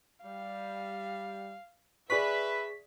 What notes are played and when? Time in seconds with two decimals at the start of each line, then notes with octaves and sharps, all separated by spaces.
0.24 G3 F5
2.10 G#4 B4 D5 E5 C#6 B6